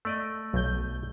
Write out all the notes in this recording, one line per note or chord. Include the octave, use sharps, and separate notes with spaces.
A3 D5 D#5
B1 G6